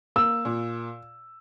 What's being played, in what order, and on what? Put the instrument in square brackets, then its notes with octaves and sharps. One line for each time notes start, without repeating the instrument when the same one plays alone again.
[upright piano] A#3 [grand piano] E6
[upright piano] A#2